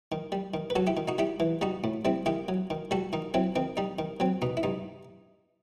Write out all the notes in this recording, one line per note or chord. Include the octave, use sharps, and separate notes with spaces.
D#3
G3
D#3
B4
F#3 F#4 A4
E4 G4
D#3
D#4 F#4
G3 E4 G4
E3
G3 D#4 F#4
A2
G3 C4 E4
D#3 E4 G4
F#3
D#3
G3 F#4 A4
D#3 D#4
F#3 C4 E4
D#3 C4
G3 D#4
D#3
F#3 C4
B2 D#4
E4
G2 D#4